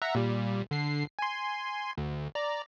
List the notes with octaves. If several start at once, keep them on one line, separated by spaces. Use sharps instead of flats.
E5 F#5 A#5
A#2 G3
D3 C7
G#5 C6
D2
D5 A#5